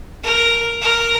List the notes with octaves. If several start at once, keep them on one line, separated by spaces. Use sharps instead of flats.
A#4
A#4